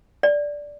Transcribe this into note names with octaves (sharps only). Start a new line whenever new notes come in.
D5